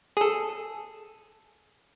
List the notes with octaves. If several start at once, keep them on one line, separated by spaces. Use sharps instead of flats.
G#4 A4